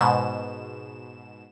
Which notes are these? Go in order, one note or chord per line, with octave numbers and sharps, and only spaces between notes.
G#2 B2 E7